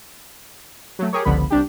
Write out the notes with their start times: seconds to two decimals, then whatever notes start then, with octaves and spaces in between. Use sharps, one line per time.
0.99 F#3 A3
1.13 G4 G#4 A#4 C#5
1.25 G1 C#2 D3 F3 B3 B5
1.51 C2 D4 G4